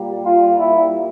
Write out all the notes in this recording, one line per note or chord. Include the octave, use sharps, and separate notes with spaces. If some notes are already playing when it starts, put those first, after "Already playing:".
Already playing: A#2 G3 A#3
F4
E4